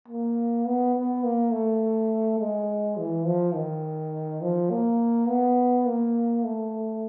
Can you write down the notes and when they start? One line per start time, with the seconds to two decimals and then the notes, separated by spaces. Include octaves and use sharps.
0.08 A#3
0.66 B3
0.95 B3
1.24 A#3
1.52 A3
2.39 G#3
2.97 E3
3.26 F3
3.55 D#3
4.42 F3
4.70 A#3
5.28 B3
5.86 A#3
6.44 A3